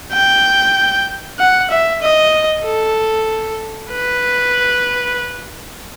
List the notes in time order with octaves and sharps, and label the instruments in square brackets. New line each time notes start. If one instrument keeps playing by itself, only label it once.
[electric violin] G5
F#5
E5
D#5
A4
B4